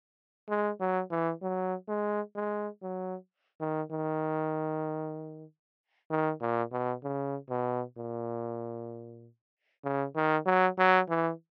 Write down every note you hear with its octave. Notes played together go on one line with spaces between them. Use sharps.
G#3
F#3
E3
F#3
G#3
G#3
F#3
D#3
D#3
D#3
A#2
B2
C#3
B2
A#2
C#3
D#3
F#3
F#3
E3